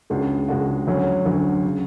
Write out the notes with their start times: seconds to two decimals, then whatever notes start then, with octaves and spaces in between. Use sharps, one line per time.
0.10 C#2 C#3 G#3 D4 F#4
0.48 C#2 C#3 G#3 D4 F#4
0.87 D2 D3 F#3 C#4
1.25 D2 D3 F#3 C#4
1.65 C#3